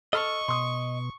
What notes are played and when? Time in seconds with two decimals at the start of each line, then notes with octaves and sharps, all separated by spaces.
0.13 A4 D#5 C#6 F6
0.48 B2 C6 D#6